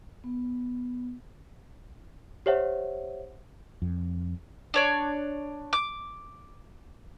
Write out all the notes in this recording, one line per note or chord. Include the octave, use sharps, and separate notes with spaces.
B3
G4 C5 C#5 E5 F#5
F2
D4 C#5 D5
D6